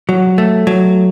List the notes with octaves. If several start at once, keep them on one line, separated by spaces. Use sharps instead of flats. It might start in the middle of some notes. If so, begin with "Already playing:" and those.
F#3
A3
F#3